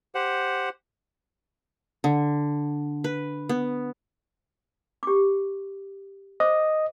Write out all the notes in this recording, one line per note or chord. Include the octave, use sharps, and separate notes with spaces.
G4 C5 F#5
D3
B4
B3
G4 D6
C5 D#5 D6